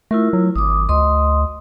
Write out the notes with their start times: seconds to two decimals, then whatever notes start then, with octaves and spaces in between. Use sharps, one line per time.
0.11 A3 E4 F4 A#4
0.33 F#3
0.56 G#1 D6 D#6
0.89 D2 D#5 C6 D#6